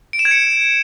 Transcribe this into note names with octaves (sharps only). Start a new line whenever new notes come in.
D7
E7
G#6
C#7